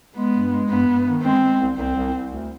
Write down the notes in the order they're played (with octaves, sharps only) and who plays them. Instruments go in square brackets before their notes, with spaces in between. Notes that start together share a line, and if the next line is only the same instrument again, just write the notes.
[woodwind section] G#3 [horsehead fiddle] B3
[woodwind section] G2
G#3
[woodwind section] G2 [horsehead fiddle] B3
[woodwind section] G2
D#3
[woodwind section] G#3 [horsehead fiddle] C4
[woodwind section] G#3
C2
[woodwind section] C2 [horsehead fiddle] C4
[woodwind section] C2
C2
D2